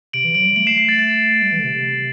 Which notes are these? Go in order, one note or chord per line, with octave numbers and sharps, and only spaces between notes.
C3 D7 F#7
E3
F#3 D7 F#7
G3
A3 D7 F#7
C7 E7
C7
A6
A6
G3
E3
D3
C3
C3